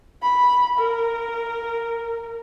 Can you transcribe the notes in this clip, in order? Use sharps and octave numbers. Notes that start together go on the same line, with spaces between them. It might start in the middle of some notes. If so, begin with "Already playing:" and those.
B5
A#4